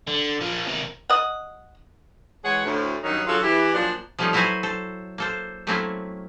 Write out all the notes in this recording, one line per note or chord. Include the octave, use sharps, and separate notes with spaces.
D3
A#2 F3
C3 D#3
D#5 F#5
E3 G#3 G#4 C#5 F#5
D2 A2
G2 D#3 F#3 C#4 D#4
D3 F#3 F4 F#4 G#4 A4
E3 G4
A#2 F3 F#3 D4
F3 G3 A3 C#4 D#4 F4
F#3 E4 F#4 B4 C5 G#5
A4 C5
A#3 A4 C5
F#3 A3 A#3 C4 C#4 E4